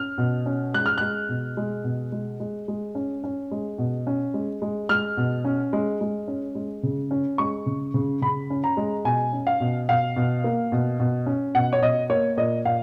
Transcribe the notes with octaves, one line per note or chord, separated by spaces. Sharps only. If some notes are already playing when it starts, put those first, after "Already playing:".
Already playing: C#4 F6
B2
C#4
G#3 F#6
F6
G#3 F#6
B2
G#3
B2
G#3
G#3
G#3
C#4
C#4
G#3
B2
C#4
G#3
G#3
G#3 F6
B2
C#4
G#3
G#3
C#4
G#3
C#3
C#4
G#3 C#6
C#3
C#3
C#3 B5
C#4
A#5
G#3
B2 G#5
C#4
F5
B2
B2 F5
B2
A#3
B2
B2
C#4
B2 F#5
C#5
B2 D#5
A#3 C#5
A#2 D#5
A#2 F5